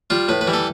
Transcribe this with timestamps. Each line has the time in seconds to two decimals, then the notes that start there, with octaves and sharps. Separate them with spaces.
0.10 G3 F4
0.28 A2 B4
0.41 B4
0.47 E3 G3
0.53 A4